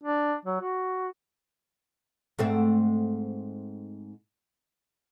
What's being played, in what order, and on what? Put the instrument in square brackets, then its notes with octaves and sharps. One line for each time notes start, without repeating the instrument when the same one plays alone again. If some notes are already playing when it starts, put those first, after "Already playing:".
[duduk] D4
F#3
F#4
[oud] G#2 A3 C4